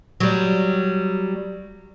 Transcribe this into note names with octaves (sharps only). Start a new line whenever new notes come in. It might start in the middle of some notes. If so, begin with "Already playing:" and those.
F#3 G3